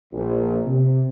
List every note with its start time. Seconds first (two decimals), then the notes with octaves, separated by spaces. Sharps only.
0.13 A#1
0.66 C3